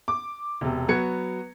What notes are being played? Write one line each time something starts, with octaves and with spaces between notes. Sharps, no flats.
D6
E1 C3
F#3 B3 F#4 G#6 C#7